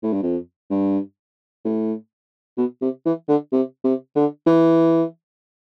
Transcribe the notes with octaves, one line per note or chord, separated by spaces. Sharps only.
A2
G2
F2
G2
A2
B2
C3
E3
D3
C3
C3
D3
E3